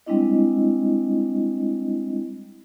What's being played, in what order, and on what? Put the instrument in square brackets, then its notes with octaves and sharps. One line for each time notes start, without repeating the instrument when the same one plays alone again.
[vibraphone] G3 G#3 C4 D4 E4 D#5